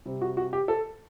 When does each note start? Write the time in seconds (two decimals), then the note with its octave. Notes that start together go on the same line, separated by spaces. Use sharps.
0.06 C3 G3 C4
0.21 F#4
0.37 F#4
0.53 G4
0.68 A4